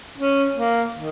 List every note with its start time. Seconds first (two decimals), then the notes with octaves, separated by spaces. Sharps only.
0.18 C#4
0.56 A#3
0.96 D#3